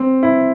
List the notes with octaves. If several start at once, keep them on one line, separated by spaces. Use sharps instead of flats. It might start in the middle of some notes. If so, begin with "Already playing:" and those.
Already playing: C4
E4